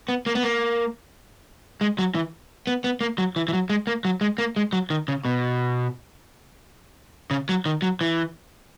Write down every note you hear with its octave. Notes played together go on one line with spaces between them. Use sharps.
B3
A#3
B3
A#3
G#3
F#3
E3
B3
B3
A#3
F#3
E3
E3
F#3
G#3
A#3
F#3
G#3
A#3
G#3
F#3
D#3
C#3
B2
C#3
F#3
D#3
F#3
E3